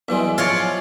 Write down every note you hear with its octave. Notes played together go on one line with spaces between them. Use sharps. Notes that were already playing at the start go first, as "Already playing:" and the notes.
B1 E3 G3 G#3 E5
F3 F4 C#5 D5